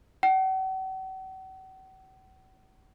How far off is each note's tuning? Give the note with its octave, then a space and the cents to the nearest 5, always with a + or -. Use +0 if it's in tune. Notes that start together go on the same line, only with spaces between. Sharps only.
F#5 +45